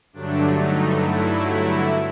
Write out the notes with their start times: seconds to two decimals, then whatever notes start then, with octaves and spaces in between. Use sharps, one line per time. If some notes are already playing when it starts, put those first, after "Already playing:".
0.13 G2 D3 F#3 A3 D4
0.57 D#4
1.00 E4